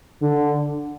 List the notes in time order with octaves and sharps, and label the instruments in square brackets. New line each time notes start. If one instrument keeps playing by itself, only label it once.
[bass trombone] D3